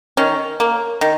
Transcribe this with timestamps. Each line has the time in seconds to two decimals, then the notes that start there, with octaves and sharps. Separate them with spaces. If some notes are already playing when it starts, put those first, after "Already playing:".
0.17 D#3 C#4
0.60 A#3
1.01 D#3